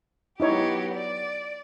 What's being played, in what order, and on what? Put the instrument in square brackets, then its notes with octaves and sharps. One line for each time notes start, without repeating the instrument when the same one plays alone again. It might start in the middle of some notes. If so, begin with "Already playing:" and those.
[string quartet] F#3 B3 G4 [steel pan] D#4 E4 C#5
[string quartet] D5